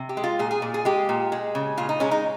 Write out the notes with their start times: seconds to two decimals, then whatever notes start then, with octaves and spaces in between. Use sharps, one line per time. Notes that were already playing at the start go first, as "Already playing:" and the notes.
Already playing: C3
0.09 G4
0.17 G#3
0.24 F4
0.39 A#2 G#4
0.51 G#4
0.62 A#2
0.74 G#4
0.85 G#3 G4
1.09 A#2
1.32 G#3
1.55 C#3
1.77 A#2 F4
1.89 D#4
2.00 G#3 C#4
2.11 D#4